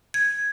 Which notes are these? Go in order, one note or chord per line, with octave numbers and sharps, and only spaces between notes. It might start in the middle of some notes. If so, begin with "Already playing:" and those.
G#6